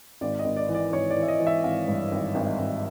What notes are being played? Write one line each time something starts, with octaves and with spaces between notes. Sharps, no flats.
G#1 D5
D#5
G#1
D5
E3
D5
G#1 C#5
D5
E3
E5
D#5
E3
E5
G#1 F5
G2
G#1
G#1
G#1